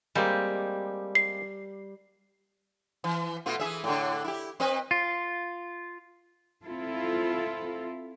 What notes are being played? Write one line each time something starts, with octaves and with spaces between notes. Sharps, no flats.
G3 G#3 A#3 C4 G4
C7
E3
B2 A3 F4
E3 G#4 E5
A2 D3
E4 G4
C4 B4 D#5
F4
C4 E4 F4 A4